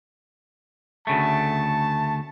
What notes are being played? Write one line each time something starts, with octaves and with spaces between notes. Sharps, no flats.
D2 C#3 A3 A5